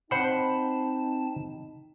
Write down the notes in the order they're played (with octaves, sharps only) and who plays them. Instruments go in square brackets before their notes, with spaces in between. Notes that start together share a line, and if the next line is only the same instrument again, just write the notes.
[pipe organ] C4 A5 [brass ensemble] D#4 [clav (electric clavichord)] C5 F#5 [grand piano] B5